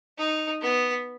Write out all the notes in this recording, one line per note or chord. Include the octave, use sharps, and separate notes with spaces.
D#4
B3